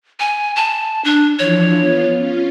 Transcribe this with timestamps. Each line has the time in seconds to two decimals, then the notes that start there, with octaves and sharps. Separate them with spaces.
0.20 G#5
0.56 A5
1.04 D4
1.39 E3 F3 D4 C#5
1.78 B3 F4
2.17 C#4 F4